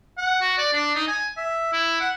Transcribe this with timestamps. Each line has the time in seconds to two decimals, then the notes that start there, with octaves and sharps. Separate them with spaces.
0.18 F#5
0.41 F#4
0.58 D5
0.73 D4
0.95 D#4
1.08 G#5
1.37 E5
1.72 E4
2.00 F#5